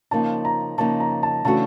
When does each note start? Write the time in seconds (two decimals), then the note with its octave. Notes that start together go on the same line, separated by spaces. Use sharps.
0.11 C#3 F3 A#3 D#4 A5
0.45 A#5
0.78 C#3 F3 A#3 D#4 A5
1.00 A#5
1.23 A5
1.45 C#3 E3 A3 D4 F#4 A5